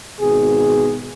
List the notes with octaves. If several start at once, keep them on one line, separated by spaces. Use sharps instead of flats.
G#1 B2 G#4